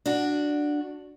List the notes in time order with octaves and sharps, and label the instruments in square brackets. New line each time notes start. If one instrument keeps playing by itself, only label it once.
[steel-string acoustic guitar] D4 F#4